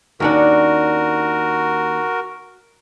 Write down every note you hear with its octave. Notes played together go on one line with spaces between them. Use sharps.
D#2 C#4 D4 F#4 A#4